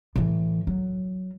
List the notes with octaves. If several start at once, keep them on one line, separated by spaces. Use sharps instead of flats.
A2 E3
F#3